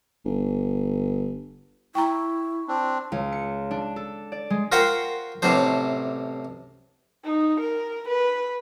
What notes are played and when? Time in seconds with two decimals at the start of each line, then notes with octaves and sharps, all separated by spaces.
0.25 G1
1.95 E4 G5 A#5 C#6
2.68 C4 D4
3.12 C#2
3.32 C#7
3.71 D4
3.96 A4
4.32 D5
4.50 G#3
4.72 F4 F#4 A#4 C5 F#5 G5
5.42 A1 A2 C3 F#3 D4 C5
7.24 D#4
7.60 A#4
8.08 B4